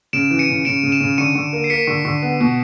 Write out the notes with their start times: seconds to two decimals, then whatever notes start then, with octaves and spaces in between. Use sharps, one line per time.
0.13 C#3 D7 E7
0.31 E3
0.39 C#7 D#7
0.48 C#3
0.65 C#3 D7 E7
0.83 C#3
0.92 D7 E7
1.00 C#3
1.18 D3 C#7 D#7
1.35 D3
1.53 A#3
1.64 C7
1.70 A#3 B6 C#7
1.87 D3
2.05 D3
2.22 B3
2.40 B2